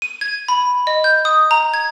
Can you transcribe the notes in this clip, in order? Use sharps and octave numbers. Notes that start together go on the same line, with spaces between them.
D#7
G#6
B5
D#5
G6
D#6
A#5
G#6